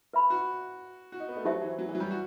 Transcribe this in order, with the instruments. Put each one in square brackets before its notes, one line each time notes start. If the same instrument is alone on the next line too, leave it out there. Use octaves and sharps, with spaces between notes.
[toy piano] B4 E5 B5
[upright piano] F#4
F#4
D#4
B3
A3
[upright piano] F#3 [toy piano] D#4 G4 C5 E5
[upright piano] E3
F#3
E3
F#3
G3
F#4